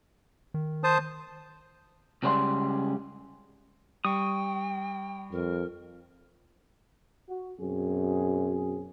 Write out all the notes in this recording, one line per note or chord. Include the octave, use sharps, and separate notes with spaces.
D#3
C5 A5 D#6
C#2 C#3 G3 C5 D5 C6
G3 G5 C#6 D#6
F2 A#4
F#4
F#2 B2 C4 G#4